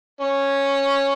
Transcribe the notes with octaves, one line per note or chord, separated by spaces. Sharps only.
C#4